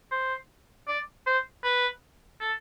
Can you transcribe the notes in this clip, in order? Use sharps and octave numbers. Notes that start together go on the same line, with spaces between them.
C5
D5
C5
B4
A4